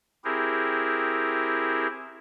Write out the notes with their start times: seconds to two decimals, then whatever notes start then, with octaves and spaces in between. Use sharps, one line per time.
0.24 C4 E4 G4 G#4 A#4